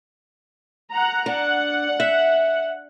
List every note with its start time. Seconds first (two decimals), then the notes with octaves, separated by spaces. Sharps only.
0.92 F#5 A#5
1.26 D4 F#5
2.00 E5